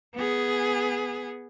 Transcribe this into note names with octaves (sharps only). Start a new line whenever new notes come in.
B3 G#4